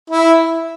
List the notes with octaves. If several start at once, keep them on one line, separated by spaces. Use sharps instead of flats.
E4